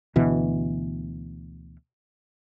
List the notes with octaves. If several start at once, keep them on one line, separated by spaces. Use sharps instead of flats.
D2 B2 E3